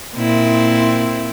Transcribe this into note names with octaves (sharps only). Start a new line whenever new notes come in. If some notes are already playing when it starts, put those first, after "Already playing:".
A#2 C4 E4